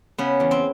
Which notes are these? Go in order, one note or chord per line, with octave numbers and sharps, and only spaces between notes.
C#3 B3
E2
C4